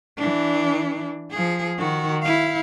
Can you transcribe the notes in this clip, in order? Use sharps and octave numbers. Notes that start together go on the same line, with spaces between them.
E3 D4
F3 G#4
D#3 F#4
E4 F5